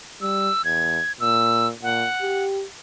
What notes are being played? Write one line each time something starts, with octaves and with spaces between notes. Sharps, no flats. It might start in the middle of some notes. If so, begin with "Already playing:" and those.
G3 E6
E2 G#6
A#2 E6
A#2 F#5
G4